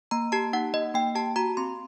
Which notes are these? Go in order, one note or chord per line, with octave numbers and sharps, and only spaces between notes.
A#3 A#5
G4 A5
D#4 F#5
A#3 D#5
A#3 G5
G4 A5
F#4 A#5
C4 C6